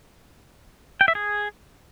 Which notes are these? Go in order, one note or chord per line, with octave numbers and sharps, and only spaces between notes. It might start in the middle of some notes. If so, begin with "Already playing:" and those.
G5
E5
G#4